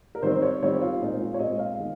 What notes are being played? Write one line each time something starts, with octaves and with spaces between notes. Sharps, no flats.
A#4
D#3 G3 C4 C5
C#5
D#3 G3 C4 C#5
G4
F4
A#2 G#3 C4 D#4
F4
C#5
A#2 G#3 C4 D#5
F5
D#3 G#3